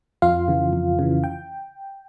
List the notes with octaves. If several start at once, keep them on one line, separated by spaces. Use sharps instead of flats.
F2 F4 F5
C#3 E3
F2
C#3 E3
G5